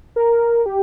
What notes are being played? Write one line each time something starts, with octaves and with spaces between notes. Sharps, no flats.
A#4
G4